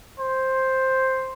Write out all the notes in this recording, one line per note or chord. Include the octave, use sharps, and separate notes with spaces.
C5